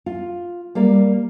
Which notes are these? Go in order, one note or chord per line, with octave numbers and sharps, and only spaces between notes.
F4
G3 A#3 D5